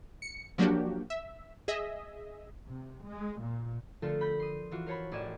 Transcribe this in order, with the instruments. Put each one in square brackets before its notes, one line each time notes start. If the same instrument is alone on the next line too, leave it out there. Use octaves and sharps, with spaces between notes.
[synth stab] C#7
F3 F#3 A#3 D4 F#4 G4
E5
G#4 D#5 E5
[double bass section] C3
G#3
A#2
[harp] D3 F3 A3 F4 A4 A#4
B5 G6 A#6 B6
C6 D#6
E3 F4 F#4
A#4 C5 C#5 A5 B5
A1 D5 D#5 G#6 E7